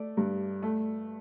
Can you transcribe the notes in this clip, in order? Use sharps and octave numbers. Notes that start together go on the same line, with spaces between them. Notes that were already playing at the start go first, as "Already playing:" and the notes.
Already playing: A3 D5
G2
A3